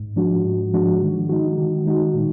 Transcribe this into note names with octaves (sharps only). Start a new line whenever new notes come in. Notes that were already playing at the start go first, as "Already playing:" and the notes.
Already playing: G#2
F3 G#3 D4 F#4
G#2
F3 G#3 D4 F#4
D#3
G#3 D#4 F#4
D#3
G#3 D#4 F#4
A#2